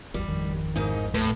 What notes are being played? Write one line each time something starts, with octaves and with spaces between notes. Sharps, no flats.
G#1 E2 G3
G#1 F2 D#3
G#2 A#3 D#4
D#2 A2 B4